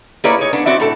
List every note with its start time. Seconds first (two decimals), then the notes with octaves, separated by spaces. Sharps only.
0.24 A#3 E4 G#4 B4 C#5 D5
0.41 D#4 C#5
0.53 B3 D4
0.66 C4 F#4 D5 E5
0.80 A2 A4 A5